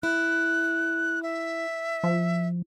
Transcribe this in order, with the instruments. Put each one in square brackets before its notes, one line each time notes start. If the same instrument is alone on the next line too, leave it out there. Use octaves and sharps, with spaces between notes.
[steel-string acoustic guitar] E4 [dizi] F#6
[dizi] E5
[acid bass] F3